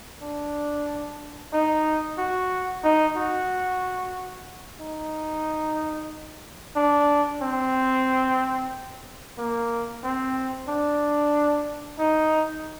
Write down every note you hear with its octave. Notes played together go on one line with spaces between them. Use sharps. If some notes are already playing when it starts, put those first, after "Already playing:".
D4
D#4
F#4
D#4
F#4
D#4
D4
C4
A#3
C4
D4
D#4